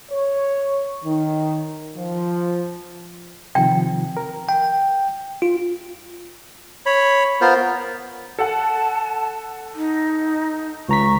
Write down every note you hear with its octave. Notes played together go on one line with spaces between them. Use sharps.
C#5
D#3
F3
C3 D#3 F3 G5
A#4
G5
F4
C#5 B5
B3 F4 A#4 C5
A4 F#5 A5
D#4
C#2 A#5 C#6 B6